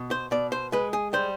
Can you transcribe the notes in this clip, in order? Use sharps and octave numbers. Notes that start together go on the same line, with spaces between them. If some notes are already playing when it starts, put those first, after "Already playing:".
Already playing: B2
C5
B2 D5
C5
G#3 B4
G#4
G3 C5